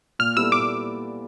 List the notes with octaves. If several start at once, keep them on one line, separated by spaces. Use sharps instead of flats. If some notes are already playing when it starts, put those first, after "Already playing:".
A#2 F6
G3 B3 E4 A4 E6
A#2 D6